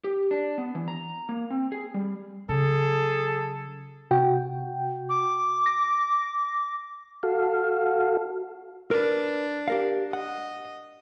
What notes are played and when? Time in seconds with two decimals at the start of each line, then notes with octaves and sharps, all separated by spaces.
0.04 G4
0.31 D4
0.58 B3
0.75 E3
0.88 A#5
1.29 A#3
1.50 C4
1.72 G#4
1.94 G3
2.49 C#3 F#3 G#4 A4
4.11 C3 F#4 G5
5.09 D6
5.66 A#6
7.23 F#4 A4 F5
8.91 D4 A#4 B4
9.68 G4 A#4 F5
10.13 D#5 F#5